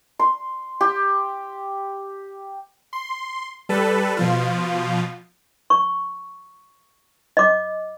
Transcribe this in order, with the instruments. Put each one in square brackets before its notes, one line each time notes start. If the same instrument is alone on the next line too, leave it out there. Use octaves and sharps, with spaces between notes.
[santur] C6
G4
[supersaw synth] C6
G3 A4 B4
B2 F3 F4
[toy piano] C#6
D#5 D6